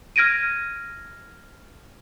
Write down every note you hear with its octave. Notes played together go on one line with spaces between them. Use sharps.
F6 G#6 A#6 D7 D#7